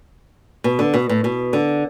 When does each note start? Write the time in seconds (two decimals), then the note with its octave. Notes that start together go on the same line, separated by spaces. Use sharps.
0.64 B2
0.79 D3
0.94 B2
1.09 A2
1.24 B2
1.53 D3